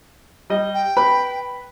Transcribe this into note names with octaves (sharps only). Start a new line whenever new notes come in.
G3 D#5
G5
B4 B5